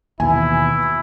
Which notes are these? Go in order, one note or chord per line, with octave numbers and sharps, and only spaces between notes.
D#2 B2 E3 E4 G#5